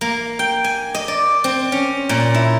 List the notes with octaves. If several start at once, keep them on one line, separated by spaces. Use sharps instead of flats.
A#3
G5
G#5
D#5
D5
C4
C#4
A#2
E4